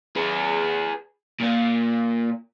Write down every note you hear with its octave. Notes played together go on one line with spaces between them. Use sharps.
G#4 B4
A#2 A#3